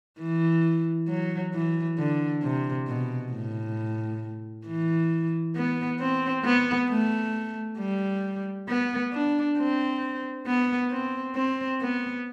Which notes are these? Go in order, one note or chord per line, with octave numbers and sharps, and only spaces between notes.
E3
F#3
E3
D3
C3
B2
A2
E3
B3
C4
B3
A3
G3
B3
D4
C4
B3
C4
C4
B3